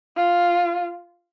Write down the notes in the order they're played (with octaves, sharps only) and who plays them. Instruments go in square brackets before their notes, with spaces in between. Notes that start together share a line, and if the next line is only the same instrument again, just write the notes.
[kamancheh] F4